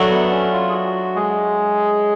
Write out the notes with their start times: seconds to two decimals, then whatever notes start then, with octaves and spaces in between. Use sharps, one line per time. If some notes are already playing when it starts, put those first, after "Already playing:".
Already playing: F#3 A3 D4
0.10 B3
0.31 C#4
0.52 F4
0.69 G#4
0.73 F#4
1.15 G#3 G#4